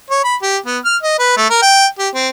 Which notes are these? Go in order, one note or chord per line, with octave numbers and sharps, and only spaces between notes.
C#5
B5
G4
B3
F6
D#5
B4
A3
A#4
G5
G4
C4